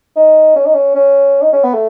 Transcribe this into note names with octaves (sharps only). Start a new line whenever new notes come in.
D#4
C#4
D#4
C#4
C#4
D#4
C#4
B3
A3